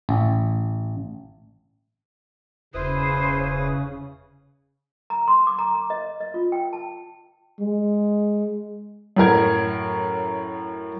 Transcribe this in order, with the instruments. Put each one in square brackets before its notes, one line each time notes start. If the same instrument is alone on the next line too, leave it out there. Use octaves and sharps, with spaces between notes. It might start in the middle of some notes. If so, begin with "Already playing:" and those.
[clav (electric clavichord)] A1
[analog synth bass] E1 [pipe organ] C#3 [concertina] E4 B4 D#6 [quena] C5
[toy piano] A#5
C6
D6
A#5
A#5
D#5
D#5
F4
G5
A5
[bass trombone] G#3
[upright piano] F#2 A2 A#4 G#6